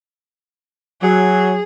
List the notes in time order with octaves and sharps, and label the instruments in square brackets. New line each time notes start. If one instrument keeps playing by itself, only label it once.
[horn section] F#3 [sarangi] G#4